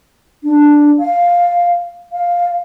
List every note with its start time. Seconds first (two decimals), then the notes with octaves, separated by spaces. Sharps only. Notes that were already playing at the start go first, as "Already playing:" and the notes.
0.44 D4
0.99 F5
2.12 F5